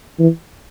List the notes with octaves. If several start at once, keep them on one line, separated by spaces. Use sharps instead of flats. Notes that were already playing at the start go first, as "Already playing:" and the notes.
E3